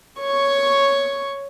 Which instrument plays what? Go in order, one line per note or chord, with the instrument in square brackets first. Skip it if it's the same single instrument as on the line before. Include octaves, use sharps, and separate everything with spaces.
[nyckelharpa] C#5 C#6